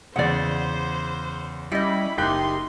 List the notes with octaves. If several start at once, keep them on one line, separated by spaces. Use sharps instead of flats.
E2 C#3 C5 D5 F#5
G3 C#4 E4 D#5 B5
F#1 D#4 G4 G5 C6 F#6